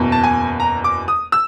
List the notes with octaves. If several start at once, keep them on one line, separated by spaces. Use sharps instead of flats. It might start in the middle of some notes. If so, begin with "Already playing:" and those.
Already playing: F#1 E2 B2
A5
G#5
A#5
D6
D#6
E6